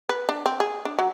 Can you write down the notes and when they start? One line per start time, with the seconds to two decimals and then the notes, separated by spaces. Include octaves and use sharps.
0.09 B4
0.29 D4
0.46 C4
0.60 G#4
0.85 D4
0.99 F#3